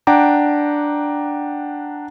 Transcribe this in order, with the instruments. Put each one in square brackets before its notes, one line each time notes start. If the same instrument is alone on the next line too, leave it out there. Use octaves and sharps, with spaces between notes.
[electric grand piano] D4 F#5 G5 A#5 D6